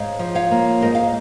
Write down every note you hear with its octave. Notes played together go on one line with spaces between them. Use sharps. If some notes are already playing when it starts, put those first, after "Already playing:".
Already playing: G#2 C#5 F5
F3
C#5 F5
A#3
G#2 A#4 D#5
F5